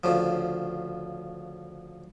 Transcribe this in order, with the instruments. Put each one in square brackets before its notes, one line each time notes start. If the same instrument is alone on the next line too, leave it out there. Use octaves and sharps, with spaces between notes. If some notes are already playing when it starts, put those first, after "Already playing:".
[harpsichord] D2 C#3 F3